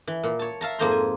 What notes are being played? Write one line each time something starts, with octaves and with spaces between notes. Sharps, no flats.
E3
A#2
C#5 A5
E5 F5 A5 A#5
F2 G#2 A#3 C5 A#5 C6
G#5